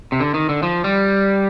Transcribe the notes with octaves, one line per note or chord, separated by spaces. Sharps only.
C3
D3
D#3
D3
F3
G3